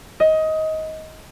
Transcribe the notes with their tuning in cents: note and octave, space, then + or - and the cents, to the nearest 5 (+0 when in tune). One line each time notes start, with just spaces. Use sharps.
D#5 +20